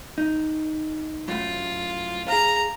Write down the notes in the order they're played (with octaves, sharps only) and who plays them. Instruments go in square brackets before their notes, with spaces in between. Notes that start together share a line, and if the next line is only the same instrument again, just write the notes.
[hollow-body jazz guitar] D#4
[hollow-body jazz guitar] F#2 A2 [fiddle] F4
[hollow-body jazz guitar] G#4 F5 [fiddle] A#5